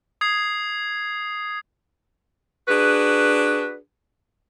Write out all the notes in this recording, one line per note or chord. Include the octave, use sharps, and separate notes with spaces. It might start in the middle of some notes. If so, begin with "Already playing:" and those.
D#6 G#6 C7
D4 F#4 G#4 B4